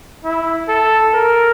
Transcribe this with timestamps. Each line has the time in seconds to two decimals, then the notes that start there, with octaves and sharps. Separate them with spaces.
0.24 E4
0.68 A4
1.14 A#4